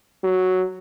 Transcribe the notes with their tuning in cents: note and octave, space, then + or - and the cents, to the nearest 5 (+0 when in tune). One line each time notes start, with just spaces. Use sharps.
F#3 +0